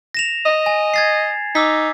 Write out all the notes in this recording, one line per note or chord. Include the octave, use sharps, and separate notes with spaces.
A#6 E7 F7
D#5
G#5
G#6 A6 C7
D#4 D6 E6 B6